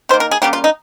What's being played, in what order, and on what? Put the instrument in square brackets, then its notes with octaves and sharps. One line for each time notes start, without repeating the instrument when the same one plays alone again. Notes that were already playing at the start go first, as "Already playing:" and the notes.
[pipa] D#3 C5
A#3
A#4
G#4
C#3 G3 A#3 G4
F4
D#4